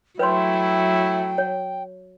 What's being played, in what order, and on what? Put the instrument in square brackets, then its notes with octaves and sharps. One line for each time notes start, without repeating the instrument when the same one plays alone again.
[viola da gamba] F#3 [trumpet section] A3 E4 [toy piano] B4 C#5 C6 [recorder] G5
[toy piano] C#5